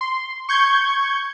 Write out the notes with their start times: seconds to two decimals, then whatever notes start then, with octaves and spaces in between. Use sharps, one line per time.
0.01 C6
0.49 C#6 G6 G#6